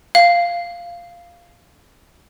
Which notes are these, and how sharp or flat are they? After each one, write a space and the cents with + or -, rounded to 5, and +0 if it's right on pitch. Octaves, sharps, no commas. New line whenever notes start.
F5 -5